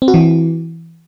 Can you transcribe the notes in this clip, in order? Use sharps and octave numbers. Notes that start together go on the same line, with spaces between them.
C4
F#4
E3